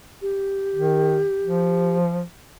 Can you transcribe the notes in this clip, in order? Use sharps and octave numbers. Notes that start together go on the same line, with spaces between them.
G4
D#3
F3